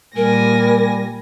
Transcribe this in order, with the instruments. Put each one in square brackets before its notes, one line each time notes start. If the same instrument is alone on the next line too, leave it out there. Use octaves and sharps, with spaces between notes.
[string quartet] A#2 G#5 A#6 [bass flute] G3 [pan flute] A#4